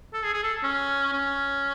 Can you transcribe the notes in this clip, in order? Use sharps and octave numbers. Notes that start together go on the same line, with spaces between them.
A4
G#4
G#4
A4
C#4
C#4